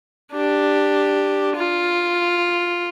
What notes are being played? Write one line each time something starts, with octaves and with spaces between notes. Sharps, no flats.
D4 G4
F4